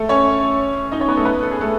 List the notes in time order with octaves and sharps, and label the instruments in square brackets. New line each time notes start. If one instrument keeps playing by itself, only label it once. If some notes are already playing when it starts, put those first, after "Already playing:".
Already playing: [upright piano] A3 A4
C#4 C#5
D#4 D#5
C#4 C#5
B3 B4
A3 A4
B3 B4
A4
G#4
A3 A4